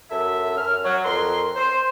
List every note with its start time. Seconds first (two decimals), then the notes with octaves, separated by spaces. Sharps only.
0.10 F#2 A4 E5
0.57 F#2 F6
0.84 F#3
1.05 F2 A#4 C6
1.56 C5